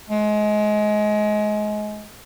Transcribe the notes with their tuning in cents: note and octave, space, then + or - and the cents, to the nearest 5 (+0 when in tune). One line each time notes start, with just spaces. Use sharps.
G#3 +25